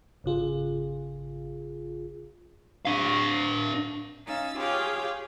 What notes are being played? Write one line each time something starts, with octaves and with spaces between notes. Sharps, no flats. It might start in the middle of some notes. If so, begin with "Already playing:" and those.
G#1 C#3 F4 G#4
D4 F5
C#4 D#4 F5 E6 A6
F4 G4 G#4 C#5 F5 G5